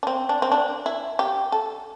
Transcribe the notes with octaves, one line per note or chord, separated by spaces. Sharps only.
D4
C4
D4
C4
D4
E4
G4
A4